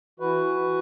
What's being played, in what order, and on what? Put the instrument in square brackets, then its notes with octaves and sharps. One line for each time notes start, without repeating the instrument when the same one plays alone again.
[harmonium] E3 F#4 B4